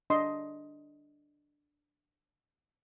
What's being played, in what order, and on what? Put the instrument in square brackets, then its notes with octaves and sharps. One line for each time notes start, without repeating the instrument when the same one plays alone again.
[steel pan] D4 D#5 C6